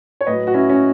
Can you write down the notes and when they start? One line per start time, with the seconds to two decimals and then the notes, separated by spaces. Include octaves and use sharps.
0.21 C#5
0.26 A2 F#3 B4 D#5
0.47 F#4
0.54 C#4 E4
0.69 C#4